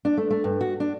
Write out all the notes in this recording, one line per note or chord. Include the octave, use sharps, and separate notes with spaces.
D4
A3
A3
G2
F#4
D4